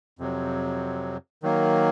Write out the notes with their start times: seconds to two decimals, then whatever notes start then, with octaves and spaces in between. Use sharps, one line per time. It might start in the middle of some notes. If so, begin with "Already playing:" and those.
0.19 F2 C3 F#3
1.43 D#3 F#3 A#3